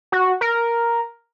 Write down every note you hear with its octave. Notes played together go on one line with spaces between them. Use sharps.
F#4
A#4